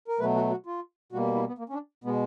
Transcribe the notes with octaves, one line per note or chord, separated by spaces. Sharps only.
A#4
B2 F#3 A3 B4
F#4
F#4
F4
B2 G3 A#3 F#4
E4
B3
A#3
C#4
D4
B2 G#3 B3